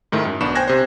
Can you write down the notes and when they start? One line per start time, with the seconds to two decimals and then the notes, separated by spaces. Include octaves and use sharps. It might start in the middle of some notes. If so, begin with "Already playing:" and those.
0.12 G#2 D#3 A3 E4
0.25 F#2
0.41 B1 B3 D4 B5 C#6 E7
0.55 C5 G5 G#5 F#6 G#6 A#6
0.68 C3 C5